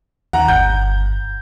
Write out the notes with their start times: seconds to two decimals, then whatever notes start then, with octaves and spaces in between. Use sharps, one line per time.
0.33 D#2 F#5 A#5
0.48 G1 G6